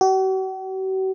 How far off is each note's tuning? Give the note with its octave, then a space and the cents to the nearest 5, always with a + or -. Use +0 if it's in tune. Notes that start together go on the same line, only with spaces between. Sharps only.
F#4 +45